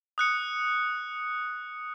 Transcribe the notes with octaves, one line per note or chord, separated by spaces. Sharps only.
D#6 F#6 C#7